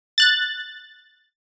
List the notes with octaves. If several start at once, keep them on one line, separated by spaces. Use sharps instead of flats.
F#6 A6